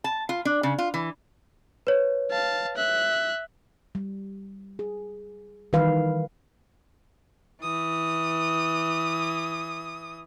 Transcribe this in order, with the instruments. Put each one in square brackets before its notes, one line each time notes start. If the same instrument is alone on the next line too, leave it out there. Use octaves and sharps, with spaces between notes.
[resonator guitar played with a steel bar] A5
F4
D4
C#3
F4
E3
[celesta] B4 C#5
[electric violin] F5 A5
E5 F#6
[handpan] G3
G#4
D#3 E3 G3 B4 F5
[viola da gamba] E3 [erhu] D#6